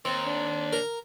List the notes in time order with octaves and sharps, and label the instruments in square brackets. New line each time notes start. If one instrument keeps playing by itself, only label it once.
[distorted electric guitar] D#2 [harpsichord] C4
[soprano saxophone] D4
[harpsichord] A#4 A#5